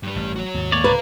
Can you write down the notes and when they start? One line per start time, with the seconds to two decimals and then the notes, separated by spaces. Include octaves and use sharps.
0.03 G2 G3
0.16 A1
0.36 F#4 C#5
0.54 D#2 G#2
0.72 G#3 A#3 C#5 D5
0.84 D1 D2 C#3 B4 F5 A#5